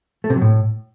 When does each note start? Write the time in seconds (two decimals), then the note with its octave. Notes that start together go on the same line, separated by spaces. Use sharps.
0.24 A3
0.30 C3
0.36 F#3
0.41 A2